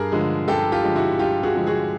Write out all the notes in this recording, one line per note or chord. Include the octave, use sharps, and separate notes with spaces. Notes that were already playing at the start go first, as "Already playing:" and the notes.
Already playing: G2 G#4 A#4
D3 F3 G#3
G2 G4 A4
F4 G4
D3 F3 G#3
E4 F#4
G2 F4 G4
F#4 G#4
D3 F3 G#3
F#4 G#4